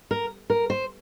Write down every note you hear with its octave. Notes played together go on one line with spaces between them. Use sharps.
A#4
A#4
C5